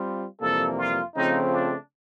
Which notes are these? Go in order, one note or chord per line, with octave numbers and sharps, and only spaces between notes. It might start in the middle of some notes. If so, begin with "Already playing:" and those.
Already playing: G3 C4 F4
F2 C3 E3 G3 A#3 A4
F4
C#3 F3 A3 C4 D#4 F4
D4